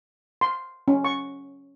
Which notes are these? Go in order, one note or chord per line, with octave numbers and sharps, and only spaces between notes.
C6
C#4
C#6